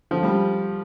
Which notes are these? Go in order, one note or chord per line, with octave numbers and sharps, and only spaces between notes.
D3 F3
G3